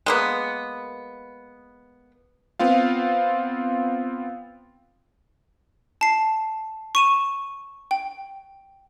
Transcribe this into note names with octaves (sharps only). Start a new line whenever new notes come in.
G#3 A#3 B3
B3 C4 F4 F5
A5 C7
C#6 D#7 E7
G5